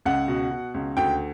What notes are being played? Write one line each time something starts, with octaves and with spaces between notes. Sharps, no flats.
C#2 F#5
B2
B2
C#2
D2 G5